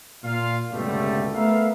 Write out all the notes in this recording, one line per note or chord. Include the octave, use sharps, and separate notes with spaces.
A#2 F4 F5
C#2 G2 B2 D3 G3 A3
A3 B3 A#4 E5 F5